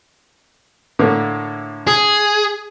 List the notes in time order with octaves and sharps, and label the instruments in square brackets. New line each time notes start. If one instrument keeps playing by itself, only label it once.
[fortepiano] A2 D3 A#3
[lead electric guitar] G#4